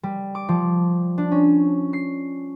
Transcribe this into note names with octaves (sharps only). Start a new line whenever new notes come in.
G3
D6
F3
D4
C#4
C7